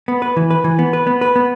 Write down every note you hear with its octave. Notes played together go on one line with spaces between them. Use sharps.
B3
B4
E3
B4
E3
B3
B4
B3
B4
B3